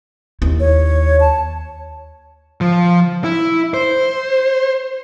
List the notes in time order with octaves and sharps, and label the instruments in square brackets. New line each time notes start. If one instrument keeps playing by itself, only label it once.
[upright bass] D#2 E4
[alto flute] C#5
A5
[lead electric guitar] F3
E4
C5